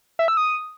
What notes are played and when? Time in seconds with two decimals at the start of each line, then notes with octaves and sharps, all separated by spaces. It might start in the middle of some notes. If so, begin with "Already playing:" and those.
0.19 E5
0.28 E6
0.37 D#6